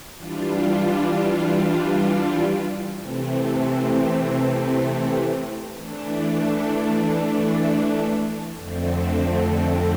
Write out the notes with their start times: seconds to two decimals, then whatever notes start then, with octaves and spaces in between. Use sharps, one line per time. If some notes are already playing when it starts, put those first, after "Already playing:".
0.16 E3 G3 D4 F4
2.96 C3 E3 A3 C4
5.75 E3 A3 D4
8.56 F2 D3 A3 C4